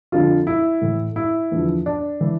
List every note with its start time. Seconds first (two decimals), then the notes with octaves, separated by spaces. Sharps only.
0.12 F2 D3 F3 F4
0.47 E4
0.81 A2 E3
1.16 E4
1.52 E2 D3 F3
1.86 D4
2.21 E3